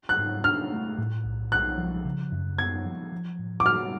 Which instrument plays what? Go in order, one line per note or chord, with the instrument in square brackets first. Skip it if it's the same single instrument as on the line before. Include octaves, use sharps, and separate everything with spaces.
[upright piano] F#6
[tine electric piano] G#2
[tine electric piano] D4 [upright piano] F6
[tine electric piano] A3
A2
B1
[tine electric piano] B1 [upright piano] F#6
[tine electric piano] F3
C#3
F#2
[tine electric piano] B3 [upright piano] G#6
[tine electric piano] F3
F3
A2
[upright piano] D6
[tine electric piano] F#4 [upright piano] F6